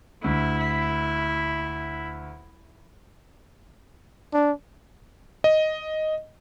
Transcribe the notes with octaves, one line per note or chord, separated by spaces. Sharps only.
D2 E4
D4
D#5